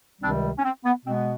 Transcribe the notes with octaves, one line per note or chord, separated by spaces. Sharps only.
C#2 C3 D#3 G3 C4 D4
C#4
C4
B3
B2 G#3 B3 C4